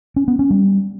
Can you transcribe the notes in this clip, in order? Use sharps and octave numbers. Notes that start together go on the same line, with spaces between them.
C#4
B3
C#4
G3